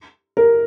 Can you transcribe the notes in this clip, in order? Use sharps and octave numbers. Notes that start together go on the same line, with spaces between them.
A#4